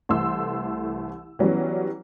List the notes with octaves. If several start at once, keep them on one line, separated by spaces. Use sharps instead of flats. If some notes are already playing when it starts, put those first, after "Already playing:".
C2 E3 A3 E4 C6 E6
E3 F#3 G3 B3 C#4